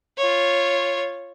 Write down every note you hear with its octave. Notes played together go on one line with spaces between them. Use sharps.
F4 C#5